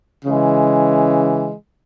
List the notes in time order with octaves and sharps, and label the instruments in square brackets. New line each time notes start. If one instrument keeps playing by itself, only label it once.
[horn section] C#3 E3 G#3